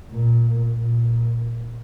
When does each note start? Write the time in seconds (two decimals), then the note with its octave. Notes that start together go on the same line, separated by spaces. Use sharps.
0.10 A#2
0.74 A#2